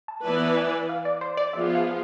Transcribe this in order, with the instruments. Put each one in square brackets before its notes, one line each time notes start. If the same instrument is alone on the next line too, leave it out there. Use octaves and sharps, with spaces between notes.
[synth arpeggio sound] A5
[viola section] E3 B3 E4 B4 D5 [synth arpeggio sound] A5
[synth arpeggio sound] G#5
F5
D5
C5
D5
[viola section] F3 B3 F4 G#4 [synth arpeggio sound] E5
[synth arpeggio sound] F5